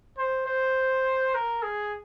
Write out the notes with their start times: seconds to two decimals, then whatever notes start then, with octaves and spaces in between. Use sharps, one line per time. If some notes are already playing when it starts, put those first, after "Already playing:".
0.17 C5
0.46 C5
1.35 A#4
1.63 G#4